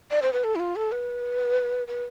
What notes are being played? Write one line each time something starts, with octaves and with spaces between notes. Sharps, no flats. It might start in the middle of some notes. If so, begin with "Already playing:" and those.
D5
C5
B4
A4
E4
F4
A4
B4
B4